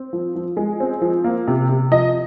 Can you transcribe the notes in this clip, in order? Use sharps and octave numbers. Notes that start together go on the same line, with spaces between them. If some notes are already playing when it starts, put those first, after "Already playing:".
Already playing: C4
F3
F3
G#3
C4
F3
A#3
C3
C3
F3 D#5